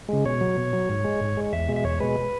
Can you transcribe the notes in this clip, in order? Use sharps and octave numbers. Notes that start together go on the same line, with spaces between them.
C#3 G#3
B2 C#5
F#3
B2
F#3
G#2
G#3
G#2
G#3
E2 E5
B2 G#3
E5
E2 C#5
B2 G#3 B4